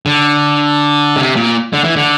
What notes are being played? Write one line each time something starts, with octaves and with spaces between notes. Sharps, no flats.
D3
C3
A#2
D3
E3
D3